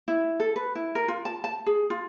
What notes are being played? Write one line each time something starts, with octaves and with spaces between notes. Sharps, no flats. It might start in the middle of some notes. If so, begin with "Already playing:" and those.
E4
A4
B4
E4
A#4
F4
A5
A5
G#4
F4